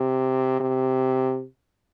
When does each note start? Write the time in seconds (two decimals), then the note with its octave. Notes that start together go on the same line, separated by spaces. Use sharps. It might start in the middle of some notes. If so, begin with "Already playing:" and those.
Already playing: C3
0.60 C3